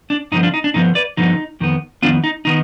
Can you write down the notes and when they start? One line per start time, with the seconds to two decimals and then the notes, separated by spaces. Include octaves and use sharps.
0.10 D4
0.32 G2 D3 F3 B3 D#4
0.43 D4 F4
0.54 D#4
0.64 D4
0.74 G2 D3 F3 B3 D#4
0.95 B4 D5
1.17 G2 D3 F3 B3 D#4
1.60 F2 D#3 B3
2.02 F2 D#3 B3 D4 F4
2.24 D#4
2.45 D#3 B3 D#4